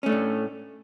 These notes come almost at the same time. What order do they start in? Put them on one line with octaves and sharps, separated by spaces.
C#4 A3 D4 A2